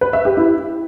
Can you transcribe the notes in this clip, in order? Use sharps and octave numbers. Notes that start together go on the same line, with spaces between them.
B4
E5
G4
E4